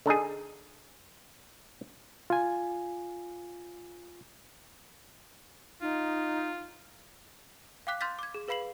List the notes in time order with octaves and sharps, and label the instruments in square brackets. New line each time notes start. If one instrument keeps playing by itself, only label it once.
[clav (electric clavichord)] D3 D4 D#4 G#4
[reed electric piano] F4 G#5
[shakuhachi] D#4 [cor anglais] F4
[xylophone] F5 G5 D6 F#6 B6
C6 F6 G6 A6 B6
D6 G#6
G#4
G#4 B4 F5 B5 C7 F#7